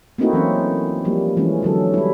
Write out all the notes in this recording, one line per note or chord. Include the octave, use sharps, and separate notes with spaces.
A3 A#3 C4 D#4 E4 F#4
E3 F#3 C4 C#4
F3 G3 A#3
E3 G#3 A3 C#4
D3 F#3 A4
G3 E4